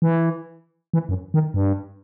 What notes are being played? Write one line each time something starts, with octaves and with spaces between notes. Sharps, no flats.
E3
E3
F#2
D#3
G2